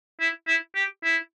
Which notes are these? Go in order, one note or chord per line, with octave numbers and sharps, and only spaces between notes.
E4
E4
G4
E4